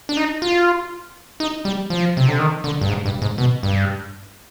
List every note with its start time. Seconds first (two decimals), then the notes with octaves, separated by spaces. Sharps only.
0.09 D4
0.17 D#4
0.42 F4
1.40 D#4
1.65 G3
1.90 F3
2.17 C3
2.28 D3
2.39 D#3
2.64 D3
2.81 G2
2.89 G#2
3.05 G2
3.22 G#2
3.38 B2
3.63 G2